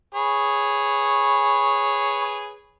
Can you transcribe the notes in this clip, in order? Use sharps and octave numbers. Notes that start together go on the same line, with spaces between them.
G#4 B4 C#5